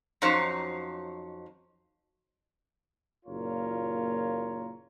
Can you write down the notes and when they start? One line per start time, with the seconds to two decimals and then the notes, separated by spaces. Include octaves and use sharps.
0.22 F2 F#3 C#4 D#4 C5
3.26 F#1 A#2 A#3 F4 A#4 C#5